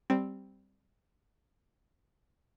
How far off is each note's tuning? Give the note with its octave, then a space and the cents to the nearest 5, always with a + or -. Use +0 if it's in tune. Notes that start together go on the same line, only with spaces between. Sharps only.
G3 +0 C4 +0